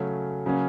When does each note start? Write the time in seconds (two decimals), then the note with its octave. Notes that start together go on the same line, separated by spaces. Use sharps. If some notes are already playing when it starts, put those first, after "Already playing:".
Already playing: C#3 F#3 A3 C#4
0.46 C#3 F#3 A#3 C#4